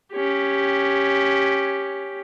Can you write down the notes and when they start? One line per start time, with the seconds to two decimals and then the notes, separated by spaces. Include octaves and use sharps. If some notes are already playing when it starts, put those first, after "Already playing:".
0.13 C#4 G4